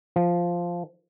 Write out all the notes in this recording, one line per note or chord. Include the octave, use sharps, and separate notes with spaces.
F3